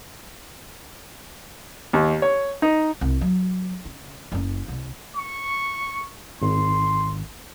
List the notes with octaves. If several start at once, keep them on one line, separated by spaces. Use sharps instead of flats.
D#2
C#5
D#4
C2
F#3
C#3
F#1 C#4
C2
C#6
G#1 C6